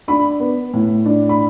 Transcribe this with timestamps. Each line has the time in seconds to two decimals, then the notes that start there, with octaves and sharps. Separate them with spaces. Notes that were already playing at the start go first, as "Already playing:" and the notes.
0.08 D4 B5
0.40 B3
0.73 A2
1.06 D4
1.29 B5